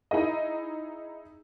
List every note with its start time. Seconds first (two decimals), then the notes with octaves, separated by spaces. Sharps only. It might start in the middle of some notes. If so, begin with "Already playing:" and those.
0.11 D#4 E4 G#4 D#5